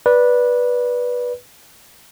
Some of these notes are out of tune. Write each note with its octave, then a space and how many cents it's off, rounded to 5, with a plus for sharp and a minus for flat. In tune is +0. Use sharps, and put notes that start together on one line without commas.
B4 -15 D5 +0